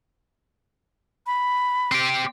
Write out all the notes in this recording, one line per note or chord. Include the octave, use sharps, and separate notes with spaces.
B5
C4 G4